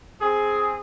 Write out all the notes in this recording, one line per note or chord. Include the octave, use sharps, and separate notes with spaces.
C4 G#4